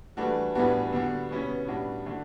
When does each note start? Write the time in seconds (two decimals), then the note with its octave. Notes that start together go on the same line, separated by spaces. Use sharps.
0.17 E3 G3 A3 D4 F#4
0.55 A2 E3 G3 B3 D4 F#4
0.93 D3 G3 B3 D4 F#4
1.30 B2 G3 B3 C#4 E4
1.68 A2 G3 D4 F#4
2.06 D3 A3 D4 F#4